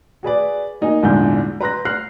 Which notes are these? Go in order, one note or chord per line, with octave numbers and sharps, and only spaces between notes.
F#4 G#4 B4 D5
A#3 D#4 F#4 D#5 G#5
A#1 E2 G#2 D3 G#3 G6
B4 A#5 C6 F#6 A#6
F6 F#6 C7